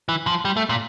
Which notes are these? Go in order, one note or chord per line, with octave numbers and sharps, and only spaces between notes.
E3
F3
G3
A3
A#2